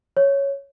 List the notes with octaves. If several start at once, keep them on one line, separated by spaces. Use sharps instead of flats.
C#5